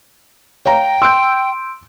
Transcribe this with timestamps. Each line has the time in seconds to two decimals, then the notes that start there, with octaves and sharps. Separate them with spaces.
0.66 C#5 F5 G5 A#5
1.02 C6 E6 G6 D7